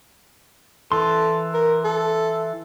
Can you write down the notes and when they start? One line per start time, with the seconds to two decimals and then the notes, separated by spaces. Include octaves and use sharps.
0.92 E3 A4 C6
1.54 A#4
1.84 A4